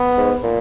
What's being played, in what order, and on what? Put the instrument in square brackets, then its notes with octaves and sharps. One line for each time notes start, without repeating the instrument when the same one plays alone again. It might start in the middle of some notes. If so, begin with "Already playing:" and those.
Already playing: [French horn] B3
[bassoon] G#2
A#2